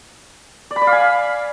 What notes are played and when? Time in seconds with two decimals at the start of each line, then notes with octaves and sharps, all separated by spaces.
0.71 D5
0.76 B5
0.82 D5
0.87 F5
0.92 G#5